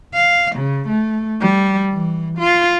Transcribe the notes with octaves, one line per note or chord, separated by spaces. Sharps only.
F5
C#3
A3
G3
E3
F4